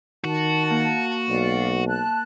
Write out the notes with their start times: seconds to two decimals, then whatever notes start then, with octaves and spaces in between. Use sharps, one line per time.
0.24 D#3 F#4 A5
0.70 A#3
1.29 B1 D5 F5
1.87 A5 F#6